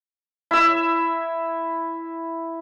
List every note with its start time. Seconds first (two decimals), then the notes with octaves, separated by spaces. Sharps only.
0.51 E4 E5